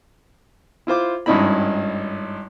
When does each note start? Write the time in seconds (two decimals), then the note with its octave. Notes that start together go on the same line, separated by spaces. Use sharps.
0.87 E4 F4 C5 D6
1.26 G#1 G2 C#4 D#4 E4 B5